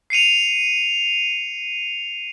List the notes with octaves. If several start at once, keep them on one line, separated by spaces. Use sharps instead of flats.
C7 C#7 D#7 F7